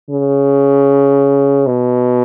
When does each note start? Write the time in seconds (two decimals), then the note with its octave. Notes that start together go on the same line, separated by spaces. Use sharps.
0.10 C#3
1.67 B2